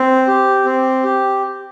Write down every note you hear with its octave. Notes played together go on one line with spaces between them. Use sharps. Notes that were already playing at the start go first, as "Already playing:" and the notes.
Already playing: C4
G4
C4
G4